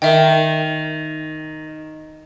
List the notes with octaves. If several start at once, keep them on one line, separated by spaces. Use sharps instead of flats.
D#3 A#4 E5 G5